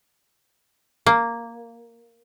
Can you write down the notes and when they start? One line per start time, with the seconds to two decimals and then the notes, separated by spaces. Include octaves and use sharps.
1.06 A#3